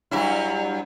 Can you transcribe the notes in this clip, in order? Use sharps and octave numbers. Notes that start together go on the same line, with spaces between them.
G2 F#3 E4